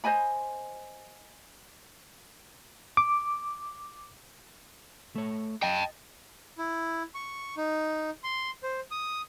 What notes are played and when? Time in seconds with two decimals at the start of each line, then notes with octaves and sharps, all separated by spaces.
0.04 C5 D#5 G#5 B5
2.97 D6
5.15 A3 C#5
5.62 D#5 G5 A5
6.58 E4
7.15 C#6
7.57 D#4
8.24 C6
8.63 C5
8.91 D#6